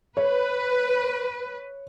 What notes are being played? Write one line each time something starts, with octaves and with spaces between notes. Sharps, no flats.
B4 C#5